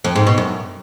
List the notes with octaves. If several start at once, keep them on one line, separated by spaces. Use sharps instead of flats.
F2
G#2
B2
F#2